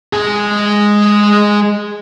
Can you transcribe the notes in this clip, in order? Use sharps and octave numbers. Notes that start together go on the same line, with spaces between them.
G#3 G#4